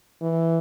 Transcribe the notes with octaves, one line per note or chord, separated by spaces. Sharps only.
E3